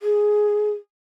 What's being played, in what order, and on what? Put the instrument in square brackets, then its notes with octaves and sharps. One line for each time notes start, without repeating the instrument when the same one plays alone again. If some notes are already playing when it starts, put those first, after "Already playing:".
[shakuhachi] G#4